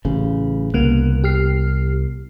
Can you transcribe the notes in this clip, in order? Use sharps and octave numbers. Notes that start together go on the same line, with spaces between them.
A1 C#3
C2 C#3 A#3 B3 F#6
G4 F6 C7